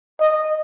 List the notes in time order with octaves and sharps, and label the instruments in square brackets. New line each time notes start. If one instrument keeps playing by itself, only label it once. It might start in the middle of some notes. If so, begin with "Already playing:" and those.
[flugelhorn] D#5